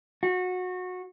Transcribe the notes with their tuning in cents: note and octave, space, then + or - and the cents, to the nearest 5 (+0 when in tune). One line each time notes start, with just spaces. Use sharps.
F#4 -20